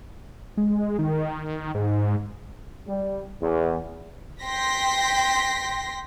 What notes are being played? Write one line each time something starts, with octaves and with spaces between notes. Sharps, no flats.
G#3
D#3
G#2
G3
E2
G5 C6 A#6 B6